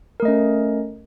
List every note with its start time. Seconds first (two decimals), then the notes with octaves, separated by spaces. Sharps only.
0.20 A#4
0.22 A3
0.25 D#5
0.28 C#4